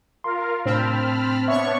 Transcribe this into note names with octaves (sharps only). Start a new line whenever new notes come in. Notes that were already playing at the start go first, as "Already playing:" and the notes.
F4 A#4 F5 C6
A2 C3 C4 D4 A5 B5 F6
B3 D4 C#5 E5 C#6